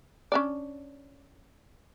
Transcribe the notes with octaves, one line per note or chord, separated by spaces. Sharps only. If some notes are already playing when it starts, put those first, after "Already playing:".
C#4 D4 D5